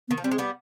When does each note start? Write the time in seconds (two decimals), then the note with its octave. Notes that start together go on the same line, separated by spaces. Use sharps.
0.08 D#3 B3
0.18 F3
0.24 G3 C4
0.31 G#3
0.38 G3 B3